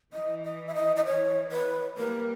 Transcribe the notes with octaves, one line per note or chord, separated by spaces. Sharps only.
E3 D#5
D#5
E5
D#5
D#5
C#5
B4
G3 A#3 A#4